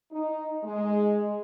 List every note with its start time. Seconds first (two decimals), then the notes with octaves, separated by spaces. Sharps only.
0.11 D#4
0.63 G#3